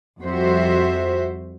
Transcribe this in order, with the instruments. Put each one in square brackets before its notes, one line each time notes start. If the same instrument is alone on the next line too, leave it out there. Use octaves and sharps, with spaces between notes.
[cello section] F2 G3 F#4 C5 E5